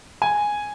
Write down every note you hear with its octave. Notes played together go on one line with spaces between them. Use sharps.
G#5